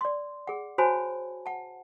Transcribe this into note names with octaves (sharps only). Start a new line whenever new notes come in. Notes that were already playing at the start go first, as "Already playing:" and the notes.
D5 C6
G#4 F#5
F#4 C5 C#5 G#5 A5 B5
F#5 A5